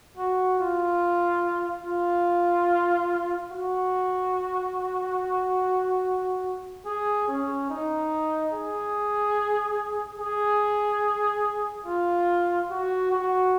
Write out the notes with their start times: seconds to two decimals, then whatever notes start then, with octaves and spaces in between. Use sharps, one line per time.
0.18 F#4
0.60 F4
1.85 F4
3.52 F#4
6.86 G#4
7.28 C#4
7.70 D#4
8.53 G#4
10.19 G#4
11.86 F4
12.71 F#4
13.11 F#4